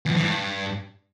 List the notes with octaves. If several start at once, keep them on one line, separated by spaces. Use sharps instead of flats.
E2
F2
E3
G2